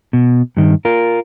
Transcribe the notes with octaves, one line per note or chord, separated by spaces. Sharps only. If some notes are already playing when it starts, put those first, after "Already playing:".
B2
G2 D#3
F4 A#4